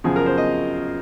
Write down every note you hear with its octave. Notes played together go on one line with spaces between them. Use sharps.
F#2 C#3 F3 G#4
A#4
C5
D#5